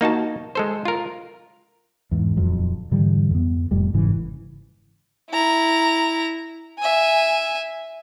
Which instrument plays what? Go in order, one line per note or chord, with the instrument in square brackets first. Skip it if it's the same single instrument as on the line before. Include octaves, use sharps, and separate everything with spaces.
[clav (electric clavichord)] A#3 D#4 F#4 A5
G#3 A4 C5
F4 A#4
[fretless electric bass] E2 G#2
D#1 F2 F#3
G#2 D3 E3 G3
F2 B3
F1 F2 A2 G3
G1 G#2 C#3 E3
[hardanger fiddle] E4 A#5
E5 G#5